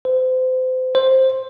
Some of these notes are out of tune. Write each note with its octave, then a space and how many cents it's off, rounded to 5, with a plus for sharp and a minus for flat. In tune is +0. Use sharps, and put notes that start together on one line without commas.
C5 -30
C5 +10